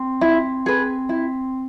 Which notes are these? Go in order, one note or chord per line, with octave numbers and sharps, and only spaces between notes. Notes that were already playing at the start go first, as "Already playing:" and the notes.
Already playing: C4
E4
G#4 B4
E4